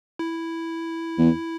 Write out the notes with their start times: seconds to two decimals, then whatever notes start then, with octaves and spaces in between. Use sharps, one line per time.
0.19 E4
1.18 E2